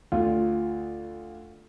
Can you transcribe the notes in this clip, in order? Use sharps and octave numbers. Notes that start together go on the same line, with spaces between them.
D2 F4